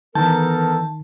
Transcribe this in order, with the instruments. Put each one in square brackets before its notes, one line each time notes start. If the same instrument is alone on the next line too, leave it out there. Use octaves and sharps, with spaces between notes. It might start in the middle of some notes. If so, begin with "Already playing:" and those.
[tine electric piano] D#3 [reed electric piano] E3 G6 [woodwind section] B3 A4 A#4 [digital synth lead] A5